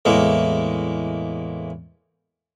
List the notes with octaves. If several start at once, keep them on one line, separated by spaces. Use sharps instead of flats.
E2 A2 G#3 A#3